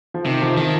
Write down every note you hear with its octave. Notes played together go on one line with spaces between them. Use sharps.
F3
C3 D#3
F3
D#3 F3